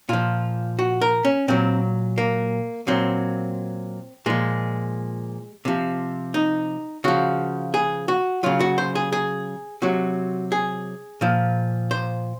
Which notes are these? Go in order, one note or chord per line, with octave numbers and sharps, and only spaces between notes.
A#2 F3 F4
F#4
A#4
C#4
A#2 F#3 C4
A#3
A#2 F#3 C4
A#2 F3 G#3
C3 F3
D#4
C#3 F3 F#4
G#4
F#4
C#3 F#3 F4
F#4
C5
G#4
G#4
C3 F#3 F#4
G#4
A#2 F3
C5